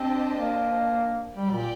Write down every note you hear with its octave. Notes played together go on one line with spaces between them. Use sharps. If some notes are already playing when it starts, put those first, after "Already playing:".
Already playing: C4 D4 G4 C5 D#5 A5
A#3
G3 G4 D5 G5
A#2